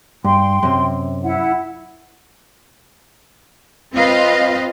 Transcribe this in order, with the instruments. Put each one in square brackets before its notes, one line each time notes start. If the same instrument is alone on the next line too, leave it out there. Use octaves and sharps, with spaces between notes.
[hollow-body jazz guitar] G2 [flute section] G5 C6
[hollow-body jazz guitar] F#2 C3
[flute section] E4 F#5
[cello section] C4 F4 B4 D#5 F5